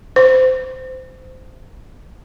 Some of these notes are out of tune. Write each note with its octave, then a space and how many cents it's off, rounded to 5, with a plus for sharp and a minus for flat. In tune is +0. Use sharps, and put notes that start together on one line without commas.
C5 -20